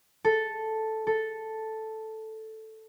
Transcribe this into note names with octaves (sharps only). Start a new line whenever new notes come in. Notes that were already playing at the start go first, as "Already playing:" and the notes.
A4
A4